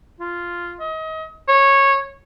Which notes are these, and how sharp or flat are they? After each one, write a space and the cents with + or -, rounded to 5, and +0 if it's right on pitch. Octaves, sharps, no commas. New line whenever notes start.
F4 -5
D#5 +30
C#5 -15